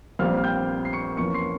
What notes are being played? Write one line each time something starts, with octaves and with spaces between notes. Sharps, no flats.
A#1 A#2 G3 C4 F5 F6
F6
G5 G6
C7
C#6 C#7
F2 E3 A#3 C#4 C#6 C#7
C6 C7